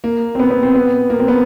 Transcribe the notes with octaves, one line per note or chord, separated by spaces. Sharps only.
A#3
C4
B3
B3
C4
B3
A#3
C4
B3